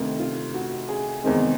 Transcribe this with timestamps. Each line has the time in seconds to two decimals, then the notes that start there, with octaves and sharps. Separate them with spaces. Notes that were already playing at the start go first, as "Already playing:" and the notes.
Already playing: D2 C3 D#3
0.20 F4
0.54 F#4
0.89 G#4
1.24 E2 C3 D#3 G#3 C4